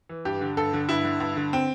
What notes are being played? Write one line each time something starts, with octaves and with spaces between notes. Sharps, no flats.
E3
G2 G4
D3
G2 A4
D3
G2 E4
D3
G2
D3
C4